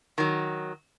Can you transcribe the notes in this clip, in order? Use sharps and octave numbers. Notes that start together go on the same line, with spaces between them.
D#3 F#3